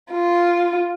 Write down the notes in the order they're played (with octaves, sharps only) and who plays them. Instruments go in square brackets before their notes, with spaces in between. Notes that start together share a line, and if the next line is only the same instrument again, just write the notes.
[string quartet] F4